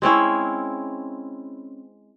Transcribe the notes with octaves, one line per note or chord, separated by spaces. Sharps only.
G#3 C4 C#4 E4